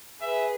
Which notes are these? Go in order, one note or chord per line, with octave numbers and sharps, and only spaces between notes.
G#4 B4 E5